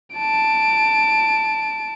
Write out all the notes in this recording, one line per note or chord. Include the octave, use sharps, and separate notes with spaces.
A5 D7